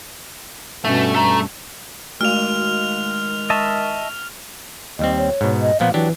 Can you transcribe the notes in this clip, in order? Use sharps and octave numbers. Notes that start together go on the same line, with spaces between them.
G2 B2 A3 C#4
A3 A#5
D#3 G#3 A3 F#4 F5 F6 F7
D#5 E5 A5 C#6
D#2 G3 C4 D#5
C#5
G#2 B2
D#5
A#2 F3 B3 F5
E3 F#3 D4 G4